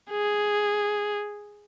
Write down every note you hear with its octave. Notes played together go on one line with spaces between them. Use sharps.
G#4